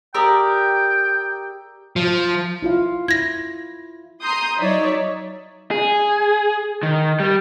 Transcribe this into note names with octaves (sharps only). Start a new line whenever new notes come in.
G4 A#4 D5 G5 A#5 D#6 E6
F3
E4 F4 F5
E4 G#6 A#6
A#5 C6 D#6 G6
F#3 D#4 C#5 D5 E5
G#4
D#3
G3